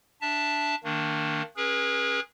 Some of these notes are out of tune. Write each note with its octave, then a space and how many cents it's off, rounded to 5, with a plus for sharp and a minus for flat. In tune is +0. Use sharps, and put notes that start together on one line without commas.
D4 +0 E5 -5 A5 +0
D#3 -5 A#3 -35 D4 +0
C#4 -20 G#4 -5 B4 -45